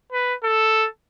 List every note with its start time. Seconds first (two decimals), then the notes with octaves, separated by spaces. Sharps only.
0.13 B4
0.43 A4